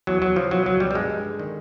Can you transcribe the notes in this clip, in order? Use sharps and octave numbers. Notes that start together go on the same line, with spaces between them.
E2 F#3
E2 F#3
C#3 F3
B2 F#3
C#2 F#3
B2 G3
G3
G2 G#3
G2
D3
D#3